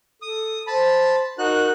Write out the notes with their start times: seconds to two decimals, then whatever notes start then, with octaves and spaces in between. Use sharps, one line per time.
0.22 A4 D#6
0.67 C5 A5 B5
1.39 D#4 F#4 A#4 F#6